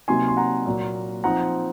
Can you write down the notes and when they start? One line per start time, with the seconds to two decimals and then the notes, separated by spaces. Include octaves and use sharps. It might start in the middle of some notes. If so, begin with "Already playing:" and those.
0.08 C3 F#3 A#3 D#4 G#5 C6
0.28 C6
0.37 F#5 A#5
0.66 A#2 F#3 A#3
1.24 F3 C4 D#4 F#5 A#5